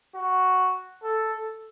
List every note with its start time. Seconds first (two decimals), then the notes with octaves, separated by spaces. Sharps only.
0.15 F#4
1.03 A4